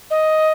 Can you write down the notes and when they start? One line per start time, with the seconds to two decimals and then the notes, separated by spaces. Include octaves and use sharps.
0.11 D#5